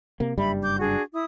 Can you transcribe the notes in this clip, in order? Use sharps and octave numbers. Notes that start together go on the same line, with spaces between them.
C3 A#3
F#1 G2 G3 E5 B5
D6 G6
D4 F#4 G#4
E4 D#6